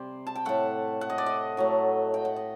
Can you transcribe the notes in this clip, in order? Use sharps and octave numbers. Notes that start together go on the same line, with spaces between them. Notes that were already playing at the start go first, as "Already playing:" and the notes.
Already playing: C3 G3 C5 D5
A5
G5
A2 A3 F#5
F#5
D#5
D5
D#5
A2 F#3 A3
G5
F#5
D#5